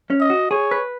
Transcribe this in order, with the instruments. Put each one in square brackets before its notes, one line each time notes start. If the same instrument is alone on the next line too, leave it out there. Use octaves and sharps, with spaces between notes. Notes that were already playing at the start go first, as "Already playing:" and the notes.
[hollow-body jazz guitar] C#4
[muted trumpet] D#5
[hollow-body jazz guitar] F#4
[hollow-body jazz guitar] G#4 [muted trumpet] C#5
[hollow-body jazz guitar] B4